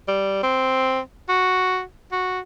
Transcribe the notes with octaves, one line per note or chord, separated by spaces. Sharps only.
G3
C4
F#4
F#4